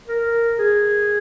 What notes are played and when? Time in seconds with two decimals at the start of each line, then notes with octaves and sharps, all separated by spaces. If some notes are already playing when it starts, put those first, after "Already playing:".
0.08 A#4
0.59 G#4